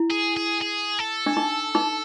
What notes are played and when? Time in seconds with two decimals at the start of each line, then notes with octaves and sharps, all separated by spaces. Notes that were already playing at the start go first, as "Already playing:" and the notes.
Already playing: E4
0.11 G#4
0.37 G#4
0.61 G#4
0.99 A4
1.26 D4
1.37 D#4
1.75 D#4